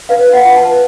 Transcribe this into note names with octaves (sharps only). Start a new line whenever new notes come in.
B4 F5
F4
F#5
F4
A5
B4